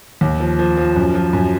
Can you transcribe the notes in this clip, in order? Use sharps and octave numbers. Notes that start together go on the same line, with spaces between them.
D#2
F3
F3
F3
F#2
F3
F#2